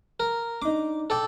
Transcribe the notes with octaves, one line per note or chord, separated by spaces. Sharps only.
A#4
D4 D#4 D6
A4 D5 G5